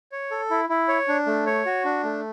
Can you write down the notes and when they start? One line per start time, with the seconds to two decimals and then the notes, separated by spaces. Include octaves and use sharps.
0.12 C#5
0.31 A4
0.51 E4
0.69 E4
0.88 C#5
1.08 D4
1.27 A3
1.46 C#5
1.66 F#4
1.85 D4
2.03 A3